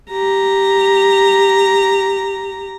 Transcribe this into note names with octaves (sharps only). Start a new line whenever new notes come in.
G4 A#5